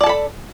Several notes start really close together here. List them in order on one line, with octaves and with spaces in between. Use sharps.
D5 A5 A4 B5